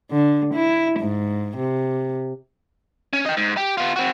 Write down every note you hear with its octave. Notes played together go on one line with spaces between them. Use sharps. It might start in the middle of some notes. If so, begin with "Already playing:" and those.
D3
E4
G#2
C3
C#4
D#5 G5
G#2
G4
B3 F4
C4 F#4